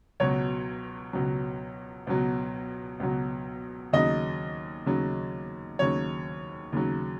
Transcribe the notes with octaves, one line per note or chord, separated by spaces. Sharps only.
C#2 B2 F#3 C#5
C#2 B2 F#3
C#2 B2 F#3
C#2 B2 F#3
D#2 C#3 F#3 D#5
D#2 C#3 F#3
D#2 C#3 F#3 C#5
D#2 C#3 F#3